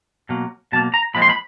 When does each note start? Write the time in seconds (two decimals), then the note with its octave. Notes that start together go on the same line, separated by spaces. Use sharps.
0.29 B2 F#3 A#3
0.72 B2 F#3 A#3 A5
0.94 A#5
1.14 A#2 F3 G#3 C4 B5
1.22 C6
1.29 B5